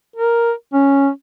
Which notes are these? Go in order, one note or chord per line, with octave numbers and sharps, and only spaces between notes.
A#4
C#4